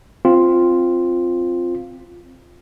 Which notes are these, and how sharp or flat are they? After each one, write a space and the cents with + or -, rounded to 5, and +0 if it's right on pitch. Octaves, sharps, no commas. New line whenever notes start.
C4 +0 F4 +0